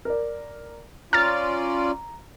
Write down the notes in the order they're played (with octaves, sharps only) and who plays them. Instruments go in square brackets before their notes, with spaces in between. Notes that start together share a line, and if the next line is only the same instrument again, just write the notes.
[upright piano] A#4 D5
[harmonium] C#4 F4 D5 [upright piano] A#5 [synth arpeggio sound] F6 A6